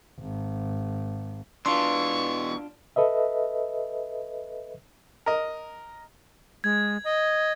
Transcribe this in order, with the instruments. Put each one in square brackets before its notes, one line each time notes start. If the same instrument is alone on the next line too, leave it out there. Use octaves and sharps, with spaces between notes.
[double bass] G#1
[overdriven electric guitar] B2 E3 [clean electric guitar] D4 F4 [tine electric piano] C6 [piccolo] C#6
[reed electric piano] A4 B4 D#5 E5
[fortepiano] A#4 D#5
[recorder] G#3 [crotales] G#6
[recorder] D#5